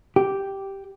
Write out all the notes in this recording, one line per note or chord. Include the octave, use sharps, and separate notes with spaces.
G4